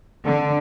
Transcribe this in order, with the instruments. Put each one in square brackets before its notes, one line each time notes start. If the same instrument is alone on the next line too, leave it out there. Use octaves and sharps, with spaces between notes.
[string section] D3